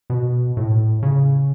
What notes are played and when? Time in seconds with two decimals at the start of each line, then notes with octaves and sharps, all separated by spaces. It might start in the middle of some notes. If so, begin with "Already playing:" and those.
0.10 B2
0.57 A2
1.03 C#3